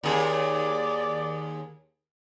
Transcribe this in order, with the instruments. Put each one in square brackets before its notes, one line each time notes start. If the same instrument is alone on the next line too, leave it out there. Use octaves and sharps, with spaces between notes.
[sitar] D#2 G#4 [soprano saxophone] D5